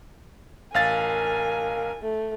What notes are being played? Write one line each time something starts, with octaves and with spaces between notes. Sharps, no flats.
A1 A#4 F5 G#5 A6
A3